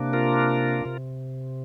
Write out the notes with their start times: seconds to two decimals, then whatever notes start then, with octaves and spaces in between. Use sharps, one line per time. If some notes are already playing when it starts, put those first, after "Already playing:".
Already playing: C3 A#3 D4
0.13 F4 A#4
0.85 C3